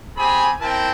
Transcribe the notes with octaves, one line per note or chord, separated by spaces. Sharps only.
C4 G4 G#4 G#5 B5
C4 E4 A#4 G5 A5